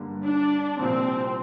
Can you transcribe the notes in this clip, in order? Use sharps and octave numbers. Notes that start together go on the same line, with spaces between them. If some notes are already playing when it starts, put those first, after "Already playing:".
Already playing: G2 D3 G3 A#3
D4
C2 A#2 F3 A#3 C4 F4